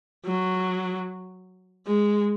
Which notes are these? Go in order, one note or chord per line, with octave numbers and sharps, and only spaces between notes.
F#3
G#3